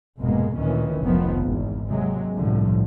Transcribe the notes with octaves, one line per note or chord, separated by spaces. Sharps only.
F1 G#2 B2 G#3 A#3
D2 A#2 D#3 E3 C#4
F1 C#2 D#3 F3 B3
G#1 E2
D#2 C3 F#3 G#3
G1 C2 A2 D3 F3